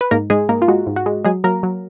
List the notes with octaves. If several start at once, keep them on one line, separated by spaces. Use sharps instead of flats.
B4
G#2 A#3 A#4
G#2 G#3 G#4
G#2 A#3 A#4
F4
G#3 F#4
G#2
F#4
G#3
F#3 G#3 G#4
F#3 A#3 A#4
F#3